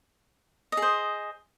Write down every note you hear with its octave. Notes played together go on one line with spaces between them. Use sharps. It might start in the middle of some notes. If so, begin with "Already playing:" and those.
G#4 C5 D#5